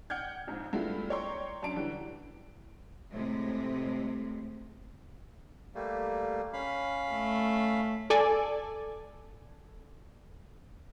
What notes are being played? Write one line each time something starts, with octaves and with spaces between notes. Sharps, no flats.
F#5 G5 F6 G6 G#6
A#1 F2 G#2
G2 G#3 A3 B3 E4 F4
C#5 D5 G5 A#5 C6 C#6
F#2 D4 A5 D7
D3 E3 G3
A2 C3 G#3
G3 A3 A#3
C#4 F5 B5
A3
A4 D5 G#5